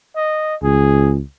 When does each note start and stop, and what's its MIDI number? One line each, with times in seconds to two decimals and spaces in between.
0.16 0.55 75
0.63 1.21 37
0.63 1.14 68